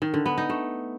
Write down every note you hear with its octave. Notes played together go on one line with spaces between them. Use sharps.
D#3
D3
B3
D#4
A3